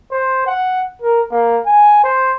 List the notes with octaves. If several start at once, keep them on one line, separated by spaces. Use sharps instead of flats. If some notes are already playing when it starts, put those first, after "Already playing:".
C5
F#5
A#4
A#3
G#5
C5